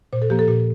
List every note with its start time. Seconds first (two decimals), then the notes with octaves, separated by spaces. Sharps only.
0.13 A#2 C5
0.22 A4
0.30 F3 A#3 G4
0.39 A4
0.48 A#2 G4